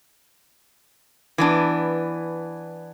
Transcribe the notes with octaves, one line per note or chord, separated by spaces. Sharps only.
E3 B3 D4